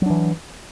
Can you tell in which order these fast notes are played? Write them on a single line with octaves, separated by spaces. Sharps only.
F#3 D4 E3